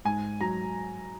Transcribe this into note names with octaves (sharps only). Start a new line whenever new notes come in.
G#2 G#5
F#3 A#5